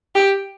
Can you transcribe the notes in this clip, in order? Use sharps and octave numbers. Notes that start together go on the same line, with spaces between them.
G4